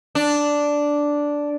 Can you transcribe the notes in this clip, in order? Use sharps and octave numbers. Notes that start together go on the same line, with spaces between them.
D4